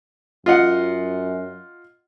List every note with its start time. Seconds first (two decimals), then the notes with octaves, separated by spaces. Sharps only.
0.46 F#2 F4 D#5 F#5